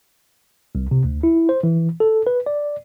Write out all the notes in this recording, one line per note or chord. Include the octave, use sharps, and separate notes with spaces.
C2
C3
D2
E4
C5
E3
A4
B4
D5